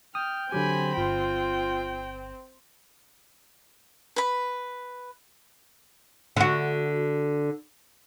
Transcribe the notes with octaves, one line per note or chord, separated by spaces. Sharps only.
G5 D#6 F6
D3 F#3 C4 G4 G#5 B5
G1 F4 G5
B4 B5
D3 F#4